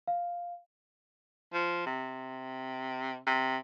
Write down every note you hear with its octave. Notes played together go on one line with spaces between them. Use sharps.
F5
F3
C3
C3